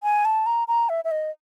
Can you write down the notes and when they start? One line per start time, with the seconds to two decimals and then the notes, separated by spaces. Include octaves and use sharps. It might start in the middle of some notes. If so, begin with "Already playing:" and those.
0.03 G#5
0.25 A5
0.46 A#5
0.68 A#5
0.89 E5
1.05 E5
1.11 D#5